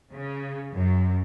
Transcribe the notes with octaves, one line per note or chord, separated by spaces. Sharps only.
C#3
F#2